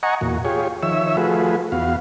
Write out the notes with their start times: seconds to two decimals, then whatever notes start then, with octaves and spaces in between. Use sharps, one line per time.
0.03 D#5 F#5 G#5 A#5 C#6
0.21 E2 A#2 F#4
0.45 F4 G4 G#4 C#5
0.83 D#3 F3 C#5 E5 E6
1.17 F3 A3 F4 F#4 G#4 B4
1.72 E2 B3 F#4 F5